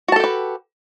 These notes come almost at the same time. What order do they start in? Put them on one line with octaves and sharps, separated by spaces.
F#4 A5 A4 G4 B4